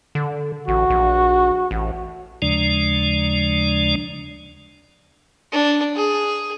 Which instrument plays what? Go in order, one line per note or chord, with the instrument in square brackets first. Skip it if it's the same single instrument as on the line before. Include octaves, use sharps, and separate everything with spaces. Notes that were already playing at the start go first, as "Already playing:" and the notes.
[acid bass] D3
[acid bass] A1 [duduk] F#4
[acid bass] A#1
A1
[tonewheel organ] D#2 C#3 F3 G#3 D4 D5
[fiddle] D4
G#4